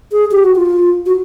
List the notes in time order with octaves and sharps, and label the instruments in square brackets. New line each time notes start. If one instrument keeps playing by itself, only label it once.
[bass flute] G#4
G4
F#4
F4
F#4